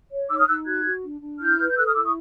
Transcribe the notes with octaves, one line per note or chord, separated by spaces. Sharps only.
C#5
D#4 D6 E6
D#6 F6
D#4 E6 F#6
F#4 F#6 G#6
F#4
D4
D4
E4 F6 G6
B4
G6
A4 E6 F#6
D#6 F6
E4 D6 E6
C#6 D#6